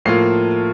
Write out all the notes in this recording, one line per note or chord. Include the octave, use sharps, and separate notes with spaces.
A2 F3 A#3 F4 C7